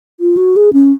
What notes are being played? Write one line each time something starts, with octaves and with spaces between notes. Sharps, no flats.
F4
F#4
G#4
C#4